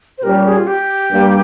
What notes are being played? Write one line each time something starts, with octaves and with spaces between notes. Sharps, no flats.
C5
A#2 G3 C#4 G4 A#4
G#4
F4
G4
G2 G3 A#3